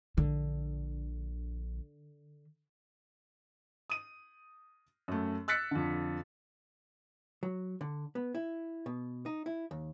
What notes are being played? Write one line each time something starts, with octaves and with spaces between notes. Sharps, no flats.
A#1 D3
D#6 D#7
F#2 A3
E6 F#6 A6 B6 C#7
F2 D3
F#3
D3
B3
E4
B2
D#4
E4
D#2